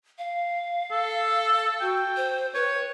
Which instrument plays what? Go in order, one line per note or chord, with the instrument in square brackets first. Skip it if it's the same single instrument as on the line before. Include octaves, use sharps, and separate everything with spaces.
[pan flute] F5
[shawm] A4
[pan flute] F#4 [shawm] G5
[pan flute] C5
[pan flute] B4 [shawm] C#5